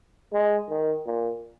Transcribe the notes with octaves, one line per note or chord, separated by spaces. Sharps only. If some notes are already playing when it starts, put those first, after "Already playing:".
G#3
D#3
A#2